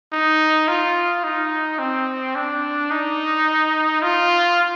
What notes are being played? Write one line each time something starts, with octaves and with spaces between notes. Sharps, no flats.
D#4
F4
D#4
C4
D4
D#4
F4